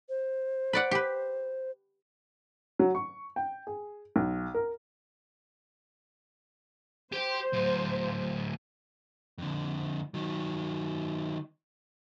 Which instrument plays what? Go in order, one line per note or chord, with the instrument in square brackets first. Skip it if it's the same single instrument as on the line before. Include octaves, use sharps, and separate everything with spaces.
[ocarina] C5
[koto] B4 D5 F#5
G4 B4
[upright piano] F#3
C#6
G5
G#4
B1
A#4
[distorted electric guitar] G4 G5 [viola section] C5
[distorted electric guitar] D2 F#3
[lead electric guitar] F2 D3
D#3 F#3